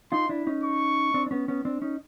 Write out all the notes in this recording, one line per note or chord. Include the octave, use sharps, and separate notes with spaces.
D#4 F4 C6
D4 E4
C#4 D#4
C#6
C4 D4
D4
B3 C#4
B3 C#4
C4 D4
C#4 D#4